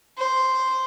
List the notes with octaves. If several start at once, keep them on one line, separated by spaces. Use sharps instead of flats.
C5